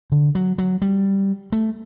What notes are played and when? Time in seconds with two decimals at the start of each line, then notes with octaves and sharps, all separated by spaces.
0.12 D3
0.35 F#3
0.58 F#3
0.82 G3
1.52 A3